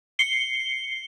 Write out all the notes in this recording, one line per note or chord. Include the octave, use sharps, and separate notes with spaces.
C7 C#7 G7